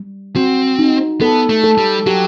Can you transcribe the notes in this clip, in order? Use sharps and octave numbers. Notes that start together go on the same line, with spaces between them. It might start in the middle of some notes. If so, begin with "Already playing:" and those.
Already playing: G3
C4 F#4
D#4
B3 A4
A3
A4
G3
F#3 G4